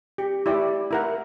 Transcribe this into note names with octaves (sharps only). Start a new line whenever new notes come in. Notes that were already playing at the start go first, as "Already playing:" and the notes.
G4
E4 G4 D5
E4 A#4 F#5